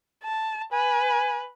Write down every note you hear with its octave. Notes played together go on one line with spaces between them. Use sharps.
A5
B4 G#5